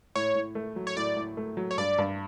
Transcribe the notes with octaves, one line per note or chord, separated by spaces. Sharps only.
A2 C#5
A2
A3
F#3
C#5
A2 D5
A2
A3
F#3
C#5
G2 D5
G2